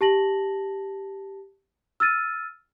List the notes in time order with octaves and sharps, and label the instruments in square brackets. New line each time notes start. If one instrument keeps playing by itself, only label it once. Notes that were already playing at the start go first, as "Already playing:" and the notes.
[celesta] G4 A5 A#6 F#7
E6 F6 A6 D#7